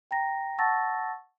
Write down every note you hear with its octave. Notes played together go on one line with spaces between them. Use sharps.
G5 A#5 A#6
F#5 A5 C#6 E6 A6 A#6